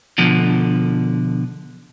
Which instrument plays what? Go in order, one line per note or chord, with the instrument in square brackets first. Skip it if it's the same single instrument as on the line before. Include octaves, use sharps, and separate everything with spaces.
[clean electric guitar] B2 D3 F3